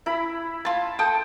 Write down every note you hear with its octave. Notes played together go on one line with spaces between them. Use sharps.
E4 B5
F4 A5 B5
A4 G5 A5 D#6